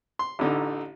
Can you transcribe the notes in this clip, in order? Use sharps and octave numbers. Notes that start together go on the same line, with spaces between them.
C6
A1 D3 D#4